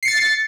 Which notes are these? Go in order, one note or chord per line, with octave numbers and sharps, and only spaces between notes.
A6 C7 C#7